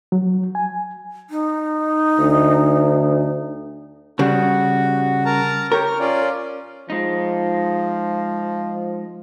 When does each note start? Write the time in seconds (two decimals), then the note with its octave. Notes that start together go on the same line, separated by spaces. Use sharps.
0.12 F#3
0.55 G#5
1.30 D#4
2.18 D2
4.19 C#3 G3 F#4
5.25 A#4 A5 A#5
5.72 G4 A#4 C#5
5.86 F6
5.99 C#4 F4 D5
6.90 F3 G#3 D#4